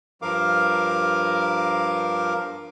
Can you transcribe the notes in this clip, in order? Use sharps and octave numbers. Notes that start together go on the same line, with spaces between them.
G2 F3 A#4 F5 D6